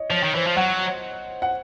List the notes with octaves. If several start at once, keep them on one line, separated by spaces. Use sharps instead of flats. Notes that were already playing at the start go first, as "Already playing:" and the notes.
Already playing: C#5 D#5
F3 C#5
D#3
E3 C5
F3
F#3 F#5
F#5